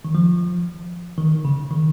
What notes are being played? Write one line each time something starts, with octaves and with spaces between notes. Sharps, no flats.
D#3
F3
D#3
C#3
D#3